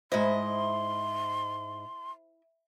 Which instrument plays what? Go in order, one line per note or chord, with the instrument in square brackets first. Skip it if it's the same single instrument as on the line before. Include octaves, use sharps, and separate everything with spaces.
[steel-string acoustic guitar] G#2 D#5 [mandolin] E4 [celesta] C5 [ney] C6